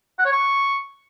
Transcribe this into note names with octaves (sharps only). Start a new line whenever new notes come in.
F#5
C#5
C#6